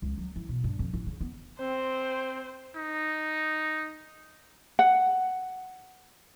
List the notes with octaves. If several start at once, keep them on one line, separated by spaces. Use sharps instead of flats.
C#2
F#3
E3
B2
G2
F2
A1
C#3
B3
C4 C5
D#4
F#5